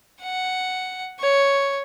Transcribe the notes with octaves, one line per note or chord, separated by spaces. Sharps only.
F#5
C#5